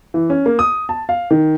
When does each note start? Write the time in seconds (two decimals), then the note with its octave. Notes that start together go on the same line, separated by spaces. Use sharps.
0.14 E3
0.30 C#4
0.46 A#3
0.59 D#6
0.89 A5
1.09 F5
1.31 D#3